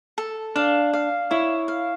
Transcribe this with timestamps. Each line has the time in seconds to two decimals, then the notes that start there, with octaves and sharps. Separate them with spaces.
0.18 A4
0.56 D4 F5
0.93 F5
1.31 E4 C#5
1.68 F5